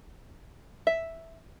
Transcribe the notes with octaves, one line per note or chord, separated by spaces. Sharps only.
E5